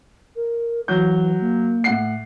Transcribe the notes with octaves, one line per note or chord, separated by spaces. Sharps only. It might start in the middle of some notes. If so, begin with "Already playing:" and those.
A#4
E3 F#3 G6
A#3
A2 F#5 C7